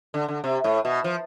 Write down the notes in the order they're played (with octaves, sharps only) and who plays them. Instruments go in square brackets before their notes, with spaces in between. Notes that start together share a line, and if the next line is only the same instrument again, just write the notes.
[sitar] D3
D3
C3
A2
B2
F3